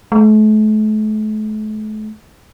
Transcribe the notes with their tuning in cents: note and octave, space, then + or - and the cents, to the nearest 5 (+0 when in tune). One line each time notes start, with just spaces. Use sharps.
A3 -40